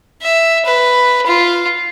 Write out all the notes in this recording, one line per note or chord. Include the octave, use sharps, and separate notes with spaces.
E5
B4
F4